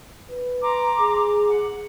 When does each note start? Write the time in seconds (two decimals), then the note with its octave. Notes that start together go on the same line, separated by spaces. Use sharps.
0.31 B4
0.61 A#5 C6 D6
0.99 G#4
1.46 F#5